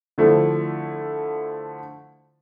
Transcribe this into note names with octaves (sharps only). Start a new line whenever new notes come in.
D3 F3 A3 E4